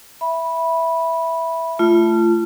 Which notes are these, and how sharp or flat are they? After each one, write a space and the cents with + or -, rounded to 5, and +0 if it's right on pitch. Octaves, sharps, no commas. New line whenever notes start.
E5 +0 B5 -10
A3 +0 F4 -30